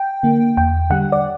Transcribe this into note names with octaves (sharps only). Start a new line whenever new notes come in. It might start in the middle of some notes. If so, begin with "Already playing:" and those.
Already playing: G5
D3 A#3
E2 G5
D3 G3 F#5
D5